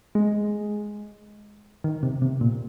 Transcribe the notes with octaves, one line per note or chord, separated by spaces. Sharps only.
G#3
D#3
C3
C3
A#2